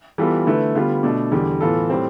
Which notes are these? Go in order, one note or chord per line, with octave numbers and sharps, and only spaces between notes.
E3 G3 B3 F4 A4
D3 A3 E4 B4
D3 G3 B3 F4
B2 A3 D4
E2 D3 G3
A2 E3 B3 F4 A4
A2 G3 C4